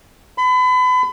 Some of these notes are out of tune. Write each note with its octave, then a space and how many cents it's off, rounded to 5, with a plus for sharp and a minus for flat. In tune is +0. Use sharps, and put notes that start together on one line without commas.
B5 +35